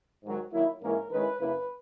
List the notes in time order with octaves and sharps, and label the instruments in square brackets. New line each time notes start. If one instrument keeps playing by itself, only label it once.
[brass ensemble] G#2 D#3 F#3
D#3 F#3 A#3 E4
G#2 E3 A#3 C#4 E4 A#4
D#3 G#3 C#4 E4 B4
F#2 C#3 F#3 A#3 E4 B4